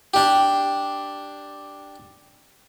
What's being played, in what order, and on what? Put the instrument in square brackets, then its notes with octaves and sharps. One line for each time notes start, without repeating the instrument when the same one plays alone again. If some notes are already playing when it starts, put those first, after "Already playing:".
[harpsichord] D4 G4